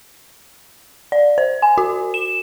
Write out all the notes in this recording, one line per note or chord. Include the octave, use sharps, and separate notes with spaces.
D5
C5
G#5
F#4
E7